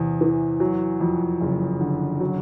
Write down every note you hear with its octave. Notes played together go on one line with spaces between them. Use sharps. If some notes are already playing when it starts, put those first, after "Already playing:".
Already playing: E2 C3
E3
F#3
F2
F#1
D3
F#3